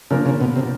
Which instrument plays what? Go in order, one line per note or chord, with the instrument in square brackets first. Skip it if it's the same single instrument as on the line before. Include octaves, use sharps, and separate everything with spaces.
[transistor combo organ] C#3 [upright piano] F3 A#3 D4 F4 A#4
[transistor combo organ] C#3
B2
C3